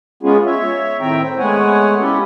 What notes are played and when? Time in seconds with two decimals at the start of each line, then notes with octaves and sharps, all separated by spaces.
0.23 G#3 B3 C#4 F4 G#4
0.46 C#5 E5
1.01 A2 D#3 C4 E5 G5 A#5
1.22 C5
1.38 G#3 A3 B3 C#5 F#5 G#5
2.00 C#4 E4 F4 G4 A4